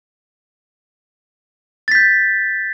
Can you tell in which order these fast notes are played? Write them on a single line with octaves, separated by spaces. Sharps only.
A6 B6 G6